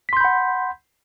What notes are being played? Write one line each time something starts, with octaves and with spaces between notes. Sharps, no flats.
F#5 B5 C6 G6 B6